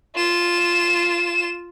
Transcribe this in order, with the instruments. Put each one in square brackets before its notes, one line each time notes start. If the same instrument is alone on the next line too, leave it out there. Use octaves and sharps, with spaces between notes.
[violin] F4 E7